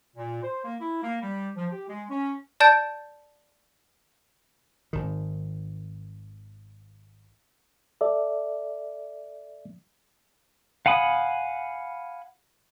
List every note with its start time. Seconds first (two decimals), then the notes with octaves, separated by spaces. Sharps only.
0.16 A#2
0.42 C5
0.64 A#3
0.80 E4
1.02 A#3
1.21 G3
1.56 F3
1.71 G4
1.88 G#3
2.09 C#4
2.60 D5 A5 G6 A6 D7
4.93 G#1 D#3
8.01 A4 D5 E5
10.86 F5 F#5 G#5 B5 D#6